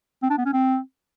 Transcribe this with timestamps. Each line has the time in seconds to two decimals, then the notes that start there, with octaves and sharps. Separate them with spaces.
0.23 C4
0.30 D4
0.38 B3
0.46 C#4
0.53 C4